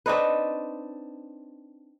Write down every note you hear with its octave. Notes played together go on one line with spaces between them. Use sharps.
C4 D4 D#4 B4